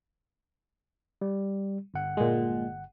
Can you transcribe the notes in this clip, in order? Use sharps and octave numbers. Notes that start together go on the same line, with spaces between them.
G3
G1 F#5
A#2 G#3